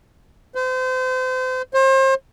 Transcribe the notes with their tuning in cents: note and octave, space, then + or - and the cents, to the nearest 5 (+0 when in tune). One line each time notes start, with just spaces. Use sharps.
C5 -35
C5 +35